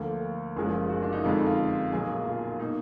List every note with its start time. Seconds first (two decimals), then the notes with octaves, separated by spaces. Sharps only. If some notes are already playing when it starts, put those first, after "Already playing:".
Already playing: D2 D3 F3 A#3 F4
0.57 F#1 F#2 F3 G#3 G#4
0.90 F#4
1.02 D4
1.13 D#4
1.24 F2 D3 G#3 F4
1.36 D#4
1.47 F4
1.92 B1 A#2 F#3 A#3 G#4
2.26 F4
2.60 B2 A#3 D#4